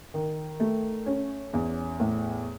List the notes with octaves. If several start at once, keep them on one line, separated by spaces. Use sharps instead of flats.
D#3
A3
C#4
E2
A2